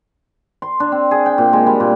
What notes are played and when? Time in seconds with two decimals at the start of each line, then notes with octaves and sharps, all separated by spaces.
0.62 C6
0.80 D4
0.92 C4
1.11 G#4
1.26 G5
1.38 A#2
1.53 G#3
1.67 G3
1.80 A#2